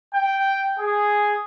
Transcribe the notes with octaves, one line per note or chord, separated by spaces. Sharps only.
G5
G#4